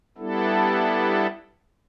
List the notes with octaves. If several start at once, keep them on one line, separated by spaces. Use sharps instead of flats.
G3 B3 D4 E4 A4